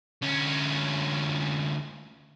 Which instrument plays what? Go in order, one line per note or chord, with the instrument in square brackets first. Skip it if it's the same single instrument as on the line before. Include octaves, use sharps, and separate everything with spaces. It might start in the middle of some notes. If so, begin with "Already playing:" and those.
[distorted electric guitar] D2 C#4